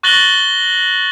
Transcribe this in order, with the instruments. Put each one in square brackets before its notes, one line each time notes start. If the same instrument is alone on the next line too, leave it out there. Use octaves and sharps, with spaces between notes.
[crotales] C#6 F#6 A6 A#6 F#7 G7